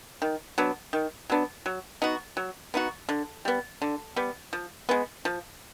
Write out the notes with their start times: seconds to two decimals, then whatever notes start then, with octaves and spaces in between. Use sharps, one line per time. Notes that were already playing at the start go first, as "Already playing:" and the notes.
0.22 D#3
0.58 F#3 B3 D4
0.93 D#3
1.30 F#3 B3 D4
1.66 F#3
2.02 B3 D#4 F#4
2.37 F#3
2.74 B3 D#4 F#4
3.09 D3
3.45 G3 B3
3.82 D3
4.16 G3 B3
4.53 F3
4.89 G#3 B3
5.25 F3